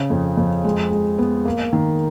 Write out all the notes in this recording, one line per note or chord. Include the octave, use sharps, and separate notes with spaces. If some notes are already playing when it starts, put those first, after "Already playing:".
Already playing: C#3
F2
F2
G#3
G#3
B3
A#3
D#3